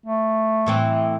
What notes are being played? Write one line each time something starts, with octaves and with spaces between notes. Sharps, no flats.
A3
A2 E3 C4